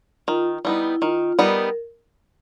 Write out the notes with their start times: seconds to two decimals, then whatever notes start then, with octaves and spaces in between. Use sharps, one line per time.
0.28 D#3 F4
0.65 G3 B3 D#4 E4
0.83 E4
1.02 D#3 F4
1.39 G3 B3 D#4 A#4